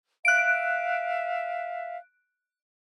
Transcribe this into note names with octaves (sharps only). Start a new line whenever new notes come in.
E5 F5 F#6 D7